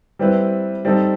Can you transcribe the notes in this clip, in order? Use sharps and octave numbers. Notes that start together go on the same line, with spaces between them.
G3 C4 E4 B4
G3 C4 D#4 A4